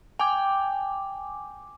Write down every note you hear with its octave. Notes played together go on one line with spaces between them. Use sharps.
G5 G#5 D6